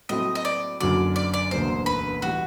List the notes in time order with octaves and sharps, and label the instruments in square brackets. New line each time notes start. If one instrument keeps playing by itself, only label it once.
[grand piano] A2 F#3 A3 C4 [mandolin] D#5
[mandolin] D#5
D5
[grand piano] F#1 F#2 D3 F#3 [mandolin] D5
[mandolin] D5
D5
[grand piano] E1 D2 D3 F#3 A#3 [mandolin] C5
[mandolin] B4
[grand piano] A2 E3 G3 [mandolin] F#4